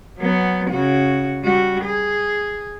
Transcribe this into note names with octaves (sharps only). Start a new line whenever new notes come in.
F#3 B3
C#3 F#4
G3 F#4
G#4